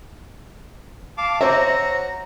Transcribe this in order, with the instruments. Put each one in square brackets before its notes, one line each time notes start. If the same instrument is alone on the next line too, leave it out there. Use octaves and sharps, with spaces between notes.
[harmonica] F5 A5 D6
[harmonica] F#4 A#5 [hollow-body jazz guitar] C5 C#5 E5